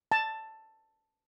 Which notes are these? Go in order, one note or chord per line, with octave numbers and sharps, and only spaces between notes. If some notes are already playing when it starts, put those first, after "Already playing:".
A5